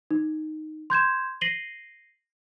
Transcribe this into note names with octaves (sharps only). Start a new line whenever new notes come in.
D#4
C6 G6 G#6 E7
A#6 C7 D#7 F#7 G7